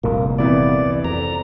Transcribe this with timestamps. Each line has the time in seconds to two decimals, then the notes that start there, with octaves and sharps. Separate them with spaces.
0.04 F1 C2 A#2 A#3
0.39 C3 E3 B3 D5
1.05 F2 A#5